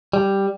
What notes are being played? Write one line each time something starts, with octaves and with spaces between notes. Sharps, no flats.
G3